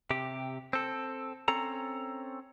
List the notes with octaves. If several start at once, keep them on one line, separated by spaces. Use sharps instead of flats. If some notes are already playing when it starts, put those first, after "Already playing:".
C3 G4
C4 A4
C4 C#4 A4 A#5